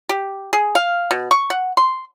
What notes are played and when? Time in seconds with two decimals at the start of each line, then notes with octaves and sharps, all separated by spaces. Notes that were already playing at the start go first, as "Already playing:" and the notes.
0.09 G4
0.53 G#4
0.75 F5
1.11 B2
1.31 C#6
1.50 F#5
1.77 C6